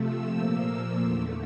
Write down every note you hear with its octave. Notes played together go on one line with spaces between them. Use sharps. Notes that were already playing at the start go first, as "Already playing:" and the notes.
Already playing: C3 F3 A3 E6
A#2 F3 A#3
E2 D3 A3